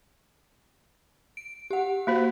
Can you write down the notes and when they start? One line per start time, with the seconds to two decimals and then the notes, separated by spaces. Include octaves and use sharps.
1.37 D7
1.71 G4 F#5
2.07 A#3 F#4 C5